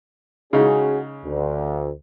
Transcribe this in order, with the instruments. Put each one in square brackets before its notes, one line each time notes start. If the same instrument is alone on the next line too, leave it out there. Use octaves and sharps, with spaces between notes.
[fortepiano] C#3 G#3 D#4 [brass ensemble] C#4 F#4 G#4
[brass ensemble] D2